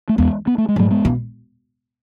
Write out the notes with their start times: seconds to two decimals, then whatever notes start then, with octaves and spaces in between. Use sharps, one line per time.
0.09 A3
0.18 E2 G#3 B3
0.47 B3
0.58 A3
0.68 G#3
0.76 G#2 F#3 A3
0.91 G#3 B3
1.05 B2